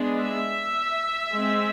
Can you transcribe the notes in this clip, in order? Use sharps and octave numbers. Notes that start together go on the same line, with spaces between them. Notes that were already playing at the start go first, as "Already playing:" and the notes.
Already playing: G#3 B3 D4
E5
G#3 C4